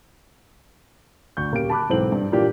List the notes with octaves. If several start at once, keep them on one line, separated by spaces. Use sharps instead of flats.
D2 C#6 G6
D#1 A#3 C#4 G4 D7
A5 B5 D6 F#6
B1 G#2 E3 C4 A4 F#7
G2
A#2 E3 A#3 D4 G4 D5